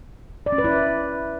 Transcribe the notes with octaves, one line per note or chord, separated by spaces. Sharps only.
D5
C#4
B4
E4